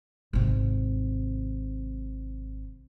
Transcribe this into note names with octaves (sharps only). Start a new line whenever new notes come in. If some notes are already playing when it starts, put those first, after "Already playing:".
G#1 C3